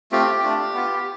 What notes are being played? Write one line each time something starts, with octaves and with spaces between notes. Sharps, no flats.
A3 C4 F4 G4
A3 D4 F4
B3 F4